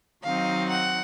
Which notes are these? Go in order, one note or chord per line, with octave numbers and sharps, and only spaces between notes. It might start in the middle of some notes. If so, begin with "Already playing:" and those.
D#3 F#3 C4 D#4 F5
F#5